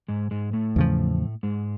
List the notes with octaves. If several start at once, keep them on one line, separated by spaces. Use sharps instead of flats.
G#2 G#3
G#2 G#3
A2 A3
E2 C#3 F3
G#2 G#3